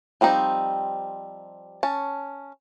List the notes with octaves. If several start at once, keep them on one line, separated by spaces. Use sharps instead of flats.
F3 G3 C4 D#4
C#4 A5